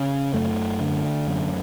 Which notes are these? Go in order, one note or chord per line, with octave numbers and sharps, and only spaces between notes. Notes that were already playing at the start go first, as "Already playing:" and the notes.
Already playing: C#3 C#4
F#2 A3
D3
F#2